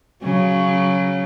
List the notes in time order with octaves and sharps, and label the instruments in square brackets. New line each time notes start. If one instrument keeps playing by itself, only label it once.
[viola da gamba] C#3 F#3